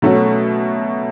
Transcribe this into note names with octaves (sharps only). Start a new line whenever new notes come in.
B2 F#3 A3 C#4 F#4